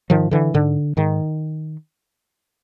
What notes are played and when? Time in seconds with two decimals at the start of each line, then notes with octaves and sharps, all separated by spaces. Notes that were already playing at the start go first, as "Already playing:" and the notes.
0.10 G#2 D#3 F3
0.31 D3 E3
0.54 G#2 D3
0.97 G#2 D#3